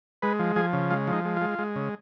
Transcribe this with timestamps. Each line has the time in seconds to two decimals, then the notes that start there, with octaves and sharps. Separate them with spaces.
0.22 G#3 B4
0.39 F3
0.56 F3 G#4
0.73 C#3
0.91 G#3 F4
1.07 F3
1.13 D#4
1.25 G#3
1.36 F4
1.41 G#3
1.59 G#3
1.76 C#3